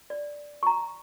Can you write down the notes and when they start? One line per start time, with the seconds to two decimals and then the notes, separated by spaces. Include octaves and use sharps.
0.10 D5
0.63 A#5 C#6